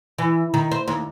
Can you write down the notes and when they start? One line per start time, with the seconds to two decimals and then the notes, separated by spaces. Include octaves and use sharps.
0.19 E3
0.54 D#3
0.72 C5
0.88 D#2